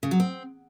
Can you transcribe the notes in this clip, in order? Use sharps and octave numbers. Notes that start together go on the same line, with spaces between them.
C#3
F#3
C4